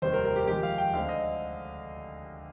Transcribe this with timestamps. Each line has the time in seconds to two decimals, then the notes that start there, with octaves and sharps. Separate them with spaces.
0.02 F1 D#2 D#3 G3 C5
0.13 A#4
0.25 A#4
0.36 G4
0.48 F2 D#3 G#3 G4
0.63 F5
0.78 G5
0.93 D2 D3 G#3 C4 D#4 F5
1.09 D#5